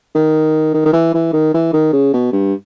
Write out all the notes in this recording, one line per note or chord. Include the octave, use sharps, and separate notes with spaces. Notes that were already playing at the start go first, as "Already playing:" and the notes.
D#3
D#3
D#3
E3
E3
D#3
E3
D#3
C#3
B2
G2